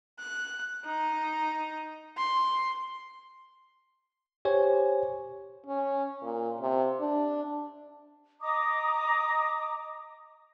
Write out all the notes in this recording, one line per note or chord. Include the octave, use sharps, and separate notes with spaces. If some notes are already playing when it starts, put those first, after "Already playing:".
F#6
D#4
C6
G4 C5 C#5 G#5
C#4
A#2
C3
D4
D#5 A#5 D6 D#6